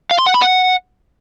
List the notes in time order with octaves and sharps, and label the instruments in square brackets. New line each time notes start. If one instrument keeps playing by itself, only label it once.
[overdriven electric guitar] F5
C6
F#5
B5
F#5